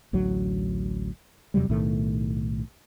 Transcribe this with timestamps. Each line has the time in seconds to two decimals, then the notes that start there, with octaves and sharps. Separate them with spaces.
0.13 A1 D2 F#3
1.54 E2 C3 F#3 G3
1.69 B1 A2 D#3 A3